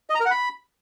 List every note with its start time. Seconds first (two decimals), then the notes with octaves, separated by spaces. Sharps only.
0.10 D#5
0.15 A#5
0.20 A#4
0.26 F#5
0.31 B5